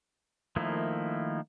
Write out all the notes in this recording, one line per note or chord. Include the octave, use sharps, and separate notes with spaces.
D#3 F3 A3 A#3 E4